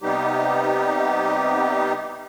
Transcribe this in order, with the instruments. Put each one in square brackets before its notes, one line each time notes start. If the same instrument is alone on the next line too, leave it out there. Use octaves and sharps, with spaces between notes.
[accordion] C3 G3 B3 D#4 G4